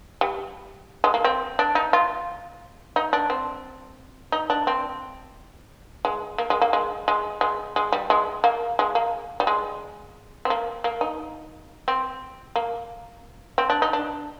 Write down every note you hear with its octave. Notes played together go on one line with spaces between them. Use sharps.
G3
G#3
A#3
C4
D4
D#4
F4
D#4
D4
C4
D#4
D4
C4
G#3
A#3
G#3
A#3
G#3
G#3
G#3
G#3
G3
G#3
A#3
G#3
A#3
G3
G#3
C4
A#3
A#3
D#4
C4
A#3
C4
D4
D#4
D4